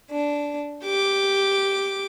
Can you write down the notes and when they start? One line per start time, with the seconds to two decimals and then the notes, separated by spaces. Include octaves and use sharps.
0.12 D4
0.84 G4 D6